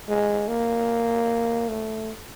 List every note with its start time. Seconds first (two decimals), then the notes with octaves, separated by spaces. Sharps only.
0.09 G#3
0.48 A#3
1.68 A3